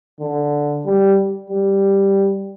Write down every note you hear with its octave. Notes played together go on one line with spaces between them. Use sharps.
D3
G3
G3